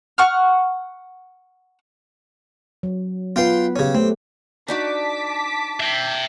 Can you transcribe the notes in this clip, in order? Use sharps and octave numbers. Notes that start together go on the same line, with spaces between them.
F#5 C#6 F6
F#3
B3 F4 B4 G5 C6
C#3 C#4 G4 C#5
A3 C4
D4 D#4 F#4 A5 D6 B6
E5 G5